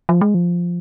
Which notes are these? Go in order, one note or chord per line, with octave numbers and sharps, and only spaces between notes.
F3
G#3
F3